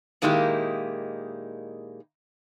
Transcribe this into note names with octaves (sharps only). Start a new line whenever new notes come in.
A#2 D#3 G#3 A#3 E4 G4